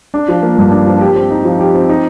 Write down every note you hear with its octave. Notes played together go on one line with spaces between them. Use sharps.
D4
F3
A#3
G2
D4
F3
G4
C4
D#4
F3
G4
C4
D#4